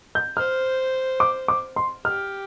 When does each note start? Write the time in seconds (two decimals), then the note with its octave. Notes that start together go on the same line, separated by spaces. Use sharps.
0.15 G6
0.37 C5 F6
1.20 D6
1.48 D6
1.76 C6
2.05 G4 F6